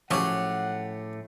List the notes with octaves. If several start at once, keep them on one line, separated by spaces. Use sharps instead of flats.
A2 F3 F#3 A3 C#4 G4 G#4 F#5